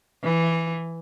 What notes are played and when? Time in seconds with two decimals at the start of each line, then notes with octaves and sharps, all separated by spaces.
0.23 E3